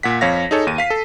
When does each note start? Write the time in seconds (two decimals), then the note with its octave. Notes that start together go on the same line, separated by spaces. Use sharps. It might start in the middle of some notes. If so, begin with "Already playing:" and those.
0.03 A#2 F#5 B6
0.21 F2 C#5 F5 A#6
0.51 D#4 G#4 A4 C#5
0.67 D#2 D#7
0.78 F5 B6 C7
0.90 A4